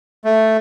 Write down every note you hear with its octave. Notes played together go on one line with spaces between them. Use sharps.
A3